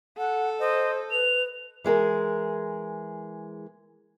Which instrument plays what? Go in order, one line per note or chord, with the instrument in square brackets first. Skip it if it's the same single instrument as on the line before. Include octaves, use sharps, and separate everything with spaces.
[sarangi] A4 [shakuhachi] F#5
[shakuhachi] C5 [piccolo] D#5
[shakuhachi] B4 [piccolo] F7
[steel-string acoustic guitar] E3 G#3 G#4 A#4